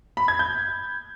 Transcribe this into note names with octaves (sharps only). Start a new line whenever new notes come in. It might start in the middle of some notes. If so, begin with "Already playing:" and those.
B5
G#6
G6